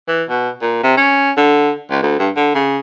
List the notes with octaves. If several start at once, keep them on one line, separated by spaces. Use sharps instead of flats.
E3
B2
A#2
C3
C#4
D3
C#2
D2
G2
D3
C#3